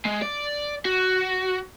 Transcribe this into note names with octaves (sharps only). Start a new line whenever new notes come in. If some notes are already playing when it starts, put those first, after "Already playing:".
G#3
D5
F#4